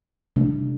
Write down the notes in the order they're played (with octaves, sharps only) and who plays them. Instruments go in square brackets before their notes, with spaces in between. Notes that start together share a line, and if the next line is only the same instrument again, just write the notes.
[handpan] C3 A3 D4